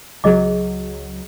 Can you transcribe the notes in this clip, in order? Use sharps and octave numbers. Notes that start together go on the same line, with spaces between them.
C#2 F#3 G#4 D#5 D6